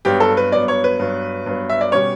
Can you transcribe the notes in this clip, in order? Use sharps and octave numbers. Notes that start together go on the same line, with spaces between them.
G2 F#3 B3 G4
A4
B4
G2 F#3 B3 D5
C#5
B4
G2 F#3 B3
G2 F#3 B3
E5
D5
B2 G3 C#4 C#5